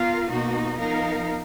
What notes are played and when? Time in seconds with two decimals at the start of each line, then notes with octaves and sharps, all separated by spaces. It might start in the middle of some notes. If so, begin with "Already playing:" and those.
Already playing: B3 F4 A#4 F5
0.29 B2 A#3 D#4 F#4
0.78 F3 B3 D#4 A#4 F5